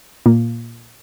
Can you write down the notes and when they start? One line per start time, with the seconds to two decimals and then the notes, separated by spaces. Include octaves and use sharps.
0.26 A#2 A#3